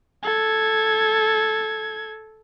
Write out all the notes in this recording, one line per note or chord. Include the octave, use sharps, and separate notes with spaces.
A4 G#6